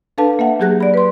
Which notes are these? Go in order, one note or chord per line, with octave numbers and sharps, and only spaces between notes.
D4 A4 B4 F5 A5
A#3 E5 F#5
F#3 A#3 G4 G#4 F#6 A#6
D5 B5
B4 C6